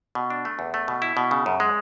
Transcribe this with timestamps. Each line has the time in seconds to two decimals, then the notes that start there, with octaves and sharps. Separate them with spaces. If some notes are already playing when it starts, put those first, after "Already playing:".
0.15 B2
0.30 D4
0.45 A3
0.59 E2
0.74 A3
0.88 B2
1.02 E4
1.17 B2
1.31 C#3
1.46 F#2
1.60 G#3